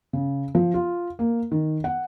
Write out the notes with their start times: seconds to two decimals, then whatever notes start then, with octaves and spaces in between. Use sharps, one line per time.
0.13 C#3
0.55 F3
0.74 F4
1.19 A#3
1.52 D#3
1.84 F#5